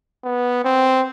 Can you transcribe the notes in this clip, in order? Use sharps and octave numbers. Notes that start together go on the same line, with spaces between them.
B3
C4